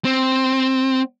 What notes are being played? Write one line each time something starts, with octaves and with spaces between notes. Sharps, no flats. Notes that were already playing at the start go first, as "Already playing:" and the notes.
C4